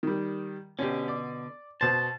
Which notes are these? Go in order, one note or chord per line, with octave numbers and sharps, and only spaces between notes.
D#3 G3
B2 D3 C#4 G4
D5
B2 C5 A5